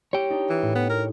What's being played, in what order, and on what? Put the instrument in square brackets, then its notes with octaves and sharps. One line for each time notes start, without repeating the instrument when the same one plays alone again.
[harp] G4 [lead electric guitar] C#5 G5
[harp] D4 D#4
[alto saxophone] E3
[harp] A2
[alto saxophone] B3
A#4